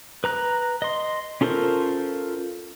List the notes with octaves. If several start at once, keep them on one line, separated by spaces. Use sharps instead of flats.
B4 A#5 F#6
D#5 C6
C#4 F4 A4 A#4 C5